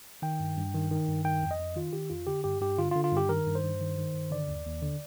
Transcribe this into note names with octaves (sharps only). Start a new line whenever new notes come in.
D#3 G5
G2
G2
D#3
D#3
G2
D#3 G5
F2
D#5
F2
D#3 F4
D#3 G4
F2 F4
D3 G4
G2 G4
G2 G4
D3 F4
F4
D3
F4
G2 G4
D#3 A#4
G2
C5
G2
D#3
D#3
G2
D3 D5
D#2
D#2
D3